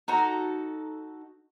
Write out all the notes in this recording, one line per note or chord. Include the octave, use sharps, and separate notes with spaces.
D#4 F#4 A4 A#5